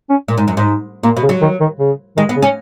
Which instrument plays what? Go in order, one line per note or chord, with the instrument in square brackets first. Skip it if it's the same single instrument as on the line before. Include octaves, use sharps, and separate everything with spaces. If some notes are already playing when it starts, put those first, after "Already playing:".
[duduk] C#4
[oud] A#2
G#2
F#2
G#2
[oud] A#2 [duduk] A#3
[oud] B2
[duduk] C#3
[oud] F#3
[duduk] D#3
D#3
C#3
[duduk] D#3 [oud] G#3
[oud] B3
[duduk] C#3
[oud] C#4